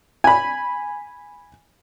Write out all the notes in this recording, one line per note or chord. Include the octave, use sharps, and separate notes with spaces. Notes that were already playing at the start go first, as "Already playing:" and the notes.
G#5 B5